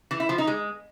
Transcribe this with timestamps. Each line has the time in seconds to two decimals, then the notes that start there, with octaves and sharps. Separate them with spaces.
0.11 E3
0.20 E4
0.29 F3
0.38 D#4
0.47 G#3